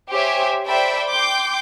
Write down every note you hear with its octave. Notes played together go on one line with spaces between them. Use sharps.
G4 C5 C#5 E5 G#5
A4 C5 D5 E5 G5 B5
G5 C6 D6 G6